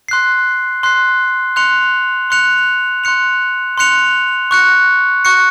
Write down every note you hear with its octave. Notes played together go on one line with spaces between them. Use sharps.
C6 F#6 C7
C6 F#6 C7
C6 F#6 C#7 F7
C6 F#6 C#7 F7
C6 F#6 C#7 F7
C6 F#6 C#7 F7
C#6 F#6 C#7
C#6 F#6 C#7